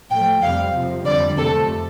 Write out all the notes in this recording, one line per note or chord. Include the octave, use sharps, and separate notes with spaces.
A2 F3 A3 G5
F2 C3 G3 F5
F2 C3 F3
F2 D3 G3 D5
F2 C3 A3 A4